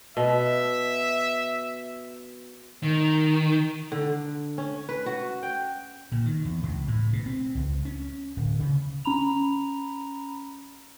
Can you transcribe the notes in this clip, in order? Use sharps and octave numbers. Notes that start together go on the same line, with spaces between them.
B2 E5
D#3
D3
C#4
B4
F#4
G5
A#2
D#3
E2
C#2
A2
B2
C4
C#2
C#4
D1
C#3
C#4 A#5 B5 F7